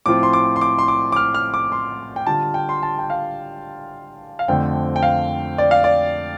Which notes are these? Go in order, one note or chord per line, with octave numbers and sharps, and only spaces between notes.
A2 F3 C4 F4 D6
C6
D6
C6
D6
C6
D6
D6
F6
F6
D6
C6
G5
D3 G3 F4 A5
G5
C6
A5
G5
F5
F5
F2 D3 A3 C4 G5
G5
F5
D5
F5
D5